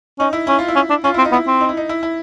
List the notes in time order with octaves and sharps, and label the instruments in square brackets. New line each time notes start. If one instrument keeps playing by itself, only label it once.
[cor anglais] C#4 [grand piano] D#4
[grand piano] E4
[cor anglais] C#4 [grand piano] E4
[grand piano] F4
E4
[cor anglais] C#4
D4
[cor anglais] C#4 [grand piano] F4
[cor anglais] C4 [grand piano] E4
[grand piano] D#4
[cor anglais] B3 [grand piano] E4
[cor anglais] C4
[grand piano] D#4
E4
D#4
E4
E4